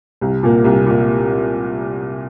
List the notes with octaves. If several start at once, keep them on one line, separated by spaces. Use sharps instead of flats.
C2
A#2 A#3
C2
A#2 A#3